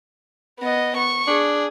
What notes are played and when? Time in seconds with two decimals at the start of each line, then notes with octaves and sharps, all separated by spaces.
0.59 B3 D#5
0.97 C#6
1.27 D4 G#4